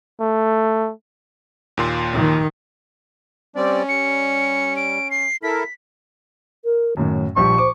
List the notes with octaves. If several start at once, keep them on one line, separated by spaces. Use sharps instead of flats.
A3
D#2 A#2 C6
D#3
G3 C4 C#4 D5
G3 C#7
D7
C7
E4 A4 A#4 B6
A#4
F#2 A2 D#3
A#1 F3 G3 G4 C#6
C5 D6